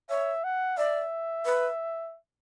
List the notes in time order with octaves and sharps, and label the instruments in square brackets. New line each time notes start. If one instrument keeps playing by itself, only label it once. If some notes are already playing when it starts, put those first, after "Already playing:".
[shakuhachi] C#5 [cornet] E5
[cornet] F#5
[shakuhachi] D5 [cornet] E5
[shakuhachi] B4